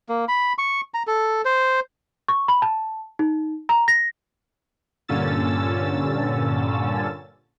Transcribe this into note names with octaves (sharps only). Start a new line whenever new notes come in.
A#3
B5
C#6
A#5
A4
C5
C#6
B5
A5
D#4
A#5
A#6
G2 A#2 D3 C#4 E6 A6